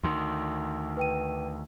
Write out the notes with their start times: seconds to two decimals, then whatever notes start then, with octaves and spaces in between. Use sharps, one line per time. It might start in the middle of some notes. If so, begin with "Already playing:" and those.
0.03 D2 D#3 C6
0.97 B4 G5 D#7